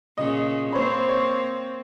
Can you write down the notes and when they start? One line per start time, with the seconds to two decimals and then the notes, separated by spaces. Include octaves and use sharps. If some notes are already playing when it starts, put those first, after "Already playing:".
0.18 A#2 C#3 D#5
0.72 A#3 C4 C5 C#5 B5
1.09 C#5